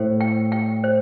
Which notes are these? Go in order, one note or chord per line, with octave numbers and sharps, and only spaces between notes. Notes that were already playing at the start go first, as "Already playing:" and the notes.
Already playing: A2 C5
G5
G5
C5